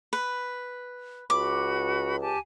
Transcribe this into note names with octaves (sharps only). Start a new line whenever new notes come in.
B4
C#2 F#4 B5 D6
G4 G#5 A5